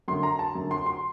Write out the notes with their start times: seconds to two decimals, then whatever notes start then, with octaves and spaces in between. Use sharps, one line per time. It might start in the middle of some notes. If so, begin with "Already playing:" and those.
0.08 F#2 D3 C6
0.23 A#5
0.39 A5
0.55 F#2 D3
0.71 C6
0.86 C6